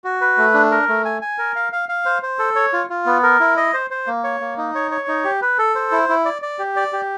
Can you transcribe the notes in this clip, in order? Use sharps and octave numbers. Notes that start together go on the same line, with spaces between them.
F#4
B4
A3
D4
A#4
A3
G#5
G#5
A#4
F5
F5
F5
C5
C5
A4
C#5
F4
F4
B3
A#4
E4
D#5
C5
C5
A#3
C#5
A#3
D#4
C#5
C#5
D#4
G4
B4
A4
C5
E4
E4
D5
D5
G4
D5
G4